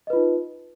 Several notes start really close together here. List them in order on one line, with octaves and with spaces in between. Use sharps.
D#5 B4 F4 D#4